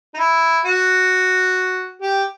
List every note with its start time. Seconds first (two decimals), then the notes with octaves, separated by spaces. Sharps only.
0.14 D#4
0.18 E4
0.65 F#4
2.02 G4